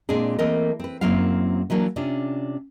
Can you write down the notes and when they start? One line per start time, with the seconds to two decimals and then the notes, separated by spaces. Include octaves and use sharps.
0.09 A#2 G#3 C4 D4 G#4
0.39 E3 A3 A#3 C4 A#4 D#5
0.80 C4 B4
1.01 F#2 F#3 A#3 C4 E4 F5
1.70 E3 F#3 A#3 D4
1.96 C3 C#4 D4 F4